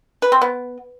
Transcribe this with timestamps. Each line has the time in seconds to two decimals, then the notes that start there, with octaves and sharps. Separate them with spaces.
0.22 B4
0.32 C4
0.42 B3